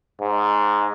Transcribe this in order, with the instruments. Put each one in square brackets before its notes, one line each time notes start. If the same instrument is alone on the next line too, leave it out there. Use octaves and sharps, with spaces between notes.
[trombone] G#2